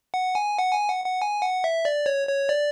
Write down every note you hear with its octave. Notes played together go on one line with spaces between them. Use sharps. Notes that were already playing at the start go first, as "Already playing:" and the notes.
F#5
G#5
F#5
G#5
F#5
F#5
G#5
F#5
E5
D5
C#5
C#5
D5